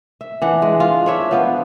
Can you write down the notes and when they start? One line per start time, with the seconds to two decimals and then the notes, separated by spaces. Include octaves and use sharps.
0.21 E5
0.42 E3 D4 F#5
0.62 G#3
0.80 F4
1.06 D4 C#5 E5
1.31 F3 B3 F4